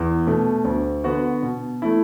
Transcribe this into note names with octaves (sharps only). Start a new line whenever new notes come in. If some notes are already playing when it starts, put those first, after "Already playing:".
Already playing: E2
B2 A3
D2
D3 B3 F#4
B2
A3 E4